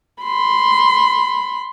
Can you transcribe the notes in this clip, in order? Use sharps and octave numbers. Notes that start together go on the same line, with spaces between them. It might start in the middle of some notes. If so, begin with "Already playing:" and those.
B5 C6